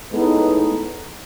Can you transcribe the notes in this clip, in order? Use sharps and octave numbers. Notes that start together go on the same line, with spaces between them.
A2 G#3 B3 D#4 A4